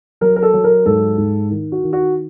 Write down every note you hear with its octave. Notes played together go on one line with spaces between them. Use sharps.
F#3 A#4
A#4
A4
F#3
A#4
G#2 A4
G#2
D#3
F#4
D#3
F#4